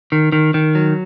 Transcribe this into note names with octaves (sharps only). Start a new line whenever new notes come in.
D#3
D#3
D#3
F#3